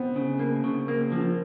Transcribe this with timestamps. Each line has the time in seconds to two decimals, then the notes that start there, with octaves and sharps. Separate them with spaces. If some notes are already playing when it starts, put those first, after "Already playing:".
Already playing: B3 C4
0.16 C#3
0.39 A#3
0.64 C#3
0.88 A#3
1.12 F3